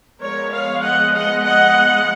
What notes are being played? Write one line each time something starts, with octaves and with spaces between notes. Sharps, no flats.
F3 G#3 B3 A#4 C#5
C#5 F5
D#5 F#5
D#5 F#5
D#5 F#5